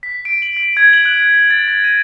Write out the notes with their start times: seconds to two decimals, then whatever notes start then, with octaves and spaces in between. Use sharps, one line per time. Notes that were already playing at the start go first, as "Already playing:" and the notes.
0.03 B6
0.25 D7
0.42 F#7
0.57 B6
0.77 G#6
0.93 F#7
1.05 F#6
1.22 B6
1.51 A6
1.68 A#6
1.84 D#7